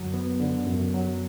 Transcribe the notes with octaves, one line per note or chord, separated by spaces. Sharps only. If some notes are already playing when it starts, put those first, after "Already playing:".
Already playing: F#2 D3 F#3
B3
D3
F#2
F#3